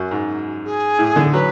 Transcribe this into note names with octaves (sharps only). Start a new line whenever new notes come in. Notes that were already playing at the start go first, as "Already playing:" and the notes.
Already playing: F#2 F#4
G#2
G#4
A2
D3
F#3 B4